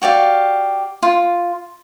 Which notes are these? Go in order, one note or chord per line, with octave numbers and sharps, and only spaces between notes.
F#4 G4 D5 F5
F4